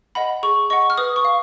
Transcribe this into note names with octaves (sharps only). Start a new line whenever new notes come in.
D#5 F#5 B5
G#4 C#6
D#5 F#5 C#6
F6
B4 D#6
C#6
F5